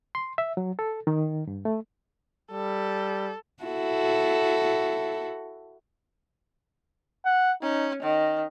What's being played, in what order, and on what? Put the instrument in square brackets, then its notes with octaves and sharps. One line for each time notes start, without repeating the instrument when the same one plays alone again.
[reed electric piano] C6
E5
F#3
A4
D#3
G2
A3
[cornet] G3 [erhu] A4
[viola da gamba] E4 F#4 A4
[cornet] F#5
[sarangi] C#4 [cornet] D#4
[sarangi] D#3 [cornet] D#5